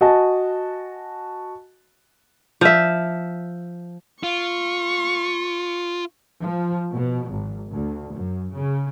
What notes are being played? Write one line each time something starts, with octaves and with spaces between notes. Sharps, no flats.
F#4 D#5 G#5 A5
F3 E5
F4 C#6
F3
B2
G#1
D2
F#2
C#3